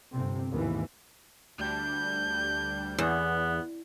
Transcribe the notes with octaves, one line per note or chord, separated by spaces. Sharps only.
G1 C3 C4
D#2 G#2 B2 E3
D2 G3 D4 G6
E2 B3